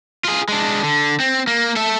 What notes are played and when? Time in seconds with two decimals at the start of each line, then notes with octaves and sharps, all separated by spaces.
0.25 F4 G#4
0.48 G#3 D4
0.84 D3
1.20 C4
1.47 A#3
1.76 A4 E5